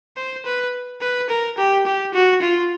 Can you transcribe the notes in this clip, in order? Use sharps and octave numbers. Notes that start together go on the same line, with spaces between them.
C5
B4
B4
A#4
G4
G4
F#4
F4